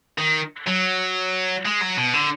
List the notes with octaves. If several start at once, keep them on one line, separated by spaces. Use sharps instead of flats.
D#3
F#3
G#3
F#3
B2
D3